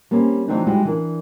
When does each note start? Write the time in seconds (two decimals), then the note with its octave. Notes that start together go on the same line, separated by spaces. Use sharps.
0.11 G3 A#3 C4 C#4
0.48 E3 F#3 A3 C4 D4 D#4
0.66 G3 G#3 D#4 E4 F#4
0.85 E3 D4 A#4